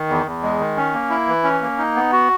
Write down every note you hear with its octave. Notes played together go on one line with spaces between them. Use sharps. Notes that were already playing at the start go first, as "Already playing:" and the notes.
Already playing: D#3
E2
E2
G#3
D#3
C#4
A#3
E4
E3
C#4
A#3
D#4
B3
F#4